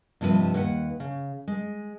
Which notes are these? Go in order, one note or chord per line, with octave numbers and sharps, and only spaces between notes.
G2 C3 F3 F4 B4 D#5
D#2 B4 F#5
C#3
G#3